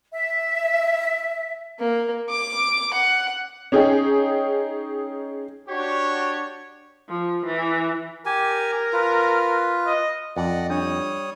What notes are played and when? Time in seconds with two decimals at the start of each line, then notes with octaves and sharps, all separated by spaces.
0.13 E5
1.79 A#3
2.30 D6
2.94 F#5
3.72 C#4 D#4 G#4 G5
5.68 D4 F#4 G4 C#5
7.09 F3
7.46 E3
8.26 G4 A#4 G#5
8.93 F4 B4
9.87 D#5
10.36 F2 D5 D#5 F#5
10.70 G3 D4 C#5 D#6